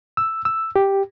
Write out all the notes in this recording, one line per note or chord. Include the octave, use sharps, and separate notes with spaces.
E6
E6
G4